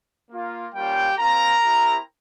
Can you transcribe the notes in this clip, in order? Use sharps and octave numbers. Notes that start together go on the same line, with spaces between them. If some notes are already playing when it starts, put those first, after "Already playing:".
A#3 F4
G3 A#3 C#4 F4 G4 G5
C4 F4 A#4 A#5
C4 E4 G4